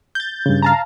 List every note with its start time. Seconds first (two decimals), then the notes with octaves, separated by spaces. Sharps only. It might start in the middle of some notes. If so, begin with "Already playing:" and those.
0.15 G6 A6
0.46 G2 C#3
0.62 F5 A5 A#5